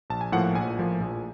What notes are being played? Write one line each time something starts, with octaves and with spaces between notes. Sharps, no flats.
A#1 A5
G#5
A2 F3 A#3 F#5
F#5
A#1 G#5
A2 F3 A#3
A#1